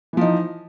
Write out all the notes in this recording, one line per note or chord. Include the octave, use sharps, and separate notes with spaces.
E3 F3 D#4